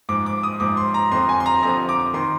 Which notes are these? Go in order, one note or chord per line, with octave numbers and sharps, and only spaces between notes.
G#2 F3 D6
D6
D#6
G#2 F3 D6
C6
A#5
F2 D3 F3 C6
G#5
C6
A#5
F2 D3 F3 A#5
D6
D#3 C6